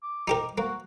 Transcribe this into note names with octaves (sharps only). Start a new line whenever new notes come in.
D6
D#4 G4 A#4 D6
A#3 F#4